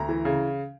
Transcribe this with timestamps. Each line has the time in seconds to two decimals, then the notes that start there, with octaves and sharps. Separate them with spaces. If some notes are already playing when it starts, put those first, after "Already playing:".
Already playing: D2 A#5
0.09 E3
0.25 C#3